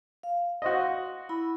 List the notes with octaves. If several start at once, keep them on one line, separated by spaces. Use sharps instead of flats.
F5
F#4 C5 D#5
E4 B5